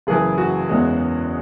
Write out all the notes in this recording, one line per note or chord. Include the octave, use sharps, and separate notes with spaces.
F#1 F#2 E3 G#4
F#4
E2 C#3 E3 G#3